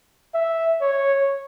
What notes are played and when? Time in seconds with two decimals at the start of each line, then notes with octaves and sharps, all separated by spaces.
0.34 E5
0.81 C#5